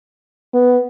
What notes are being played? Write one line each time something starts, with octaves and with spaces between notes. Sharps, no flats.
B3